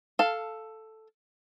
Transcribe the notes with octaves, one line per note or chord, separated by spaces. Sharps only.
A4 F5